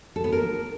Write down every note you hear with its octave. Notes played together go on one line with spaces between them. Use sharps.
A4
B3
A#4